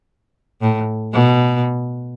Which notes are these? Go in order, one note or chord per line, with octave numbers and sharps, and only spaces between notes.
A2
B2